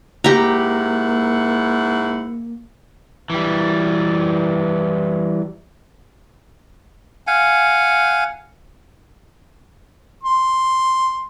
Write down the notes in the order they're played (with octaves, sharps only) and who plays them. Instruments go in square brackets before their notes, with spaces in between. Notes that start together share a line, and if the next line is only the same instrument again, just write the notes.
[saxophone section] G#2 E4 F#5 [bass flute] A#3 [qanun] G4 A#5
[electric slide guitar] E3 G3
[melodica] F5 F#5 G#5
[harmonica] C6